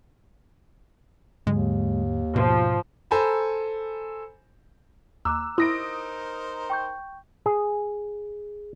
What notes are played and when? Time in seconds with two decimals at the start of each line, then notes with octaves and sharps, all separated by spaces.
1.47 D#2 G#2 D3 F#3 G#3
2.36 G#2 B2 F3
3.11 A4 C5 G#5 A#5 B5
5.25 D#2 A#5 D6 E6 F#6
5.58 D#4 E4 A#4 C5 D#6 A#6 D7
6.70 G5 C#6 G6
7.46 G#4